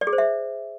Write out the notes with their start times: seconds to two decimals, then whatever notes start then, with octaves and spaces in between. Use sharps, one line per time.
0.01 D5
0.07 G#4
0.13 C5
0.18 E5